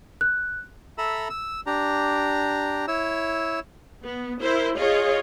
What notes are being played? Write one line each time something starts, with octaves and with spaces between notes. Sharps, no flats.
F#6
A4 E5 A#5 B5 E6
E6
D4 G4 A#5
E4 C#5 E6
B3
E4 A#4 C5
F4 G#4 C#5 D#5